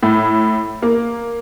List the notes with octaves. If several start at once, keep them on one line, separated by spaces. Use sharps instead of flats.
A2
A#3